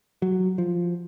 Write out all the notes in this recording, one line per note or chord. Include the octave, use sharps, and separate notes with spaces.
F#3
F3